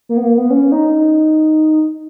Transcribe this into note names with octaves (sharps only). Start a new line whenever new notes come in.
A#3
B3
A#3
B3
C#4
D#4